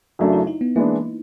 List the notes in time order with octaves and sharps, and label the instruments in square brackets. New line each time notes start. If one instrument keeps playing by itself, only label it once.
[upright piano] F#2 C#3 F#3 A3 D4
[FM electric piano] E4
D#4
B3
[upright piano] E3 G#3 B3 D4 [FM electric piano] A#3